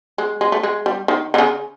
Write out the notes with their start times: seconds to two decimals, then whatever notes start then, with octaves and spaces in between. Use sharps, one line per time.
0.18 G#3
0.41 G#3
0.52 A3
0.63 G#3
0.86 G3
1.08 D#3
1.34 D3
1.38 C#3